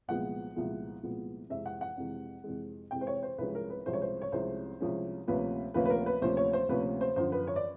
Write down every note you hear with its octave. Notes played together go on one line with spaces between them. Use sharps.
C2 A#2 F3 G#3 B3 F#5
C2 A#2 F3 G#3 B3
C2 A#2 F3 G#3 B3
F2 C3 E3 G#3 E5
F#5
F#5
F2 C3 E3 G#3
F2 C3 E3 G#3
F2 C3 E3 G#3 G5
C5
C#5
C5
C2 C3 F3 G#3 C#4 B4
A#4
B4
C2 C3 F3 G#3 C#4 C5
C#5
C5
C#5
C2 C3 F3 G#3 C#4 C5
C2 C3 F3 G#3 C#4
D2 C3 F3 A#3 C#4 B4
D2 C3 F3 A#3 C#4 B4
B4
A#4
B4
D2 C3 F3 A#3 C#4 C5
C#5
C5
D2 C3 F3 A#3 C#4 B4
C5
F#2 D3 F3 C5
B4
C#5
D5